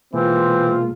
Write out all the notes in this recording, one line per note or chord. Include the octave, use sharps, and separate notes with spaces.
B2 E3 G#3 A#3 C4 F4